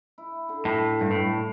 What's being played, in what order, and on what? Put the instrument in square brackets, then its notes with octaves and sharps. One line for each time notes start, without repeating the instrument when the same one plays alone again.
[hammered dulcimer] E4
D3
[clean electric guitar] A2
[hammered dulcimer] A3
[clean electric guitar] G2
[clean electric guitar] A2 [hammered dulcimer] D3